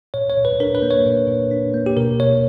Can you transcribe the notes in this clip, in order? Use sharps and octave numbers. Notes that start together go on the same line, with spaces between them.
A#2 C#5
C#5
A#2
B4
D4 A#4
B4
A#3
C#5
A#2
A#2
D4
A#3
G4
B2 A#4
B2 C#5